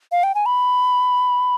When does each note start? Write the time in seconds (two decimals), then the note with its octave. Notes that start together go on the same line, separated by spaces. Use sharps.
0.12 F5
0.23 G5
0.35 G#5
0.46 B5